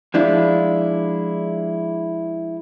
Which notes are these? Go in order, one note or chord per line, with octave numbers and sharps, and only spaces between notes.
F3 G#3 D4 E4 F4